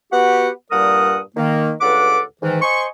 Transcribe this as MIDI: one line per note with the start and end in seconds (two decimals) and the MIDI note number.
0.12 0.49 59
0.12 0.49 66
0.12 0.49 67
0.12 0.49 78
0.72 1.19 43
0.72 1.19 46
0.72 1.19 55
0.72 1.19 70
0.72 1.19 78
0.72 1.19 87
1.37 1.72 51
1.37 1.72 58
1.81 2.21 37
1.81 2.21 43
1.81 2.21 69
1.81 2.21 71
1.81 2.21 78
1.81 2.21 86
2.42 2.60 44
2.42 2.60 51
2.42 2.60 52
2.62 2.86 72
2.62 2.86 75
2.62 2.86 80
2.62 2.86 84
2.62 2.86 85